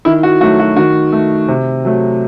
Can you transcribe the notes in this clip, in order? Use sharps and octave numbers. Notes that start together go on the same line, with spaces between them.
D#3 E4
F#4
F#3 A3 F#4
F#4
D#3 F#4
A3
C3
F#3 A3